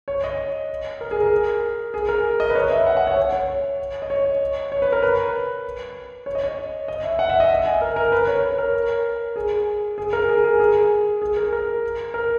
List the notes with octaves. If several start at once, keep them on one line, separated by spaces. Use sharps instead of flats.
C#5
D#5
A#4
G#4
A#4
G#4
A#4
D#5
B4
C#5
E5
F#5
F#5
C#5
C#5
C#5
D#5
C#5
C#5
B4
A#4
B4
C#5
D#5
C#5
D#5
E5
F#5
E5
D#5
E5
G#5
A#4
A#4
B4
C#5
A#4
G#4
G#4
A#4
G#4
G#4
G#4
G#4
A#4
A#4
A#4